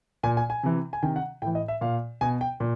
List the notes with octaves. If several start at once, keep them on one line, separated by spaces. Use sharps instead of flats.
A#2 G#5
G#5
G#5
C3 E3
G#5
C3 D#3 G5
F#5
A2 E3 G5
D#5
E5
A#2 F5
B2 G#5
G5
A#2